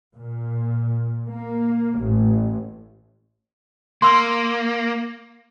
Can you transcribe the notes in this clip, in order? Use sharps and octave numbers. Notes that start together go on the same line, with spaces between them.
A#2
A#3
A1
A#3 C6 E6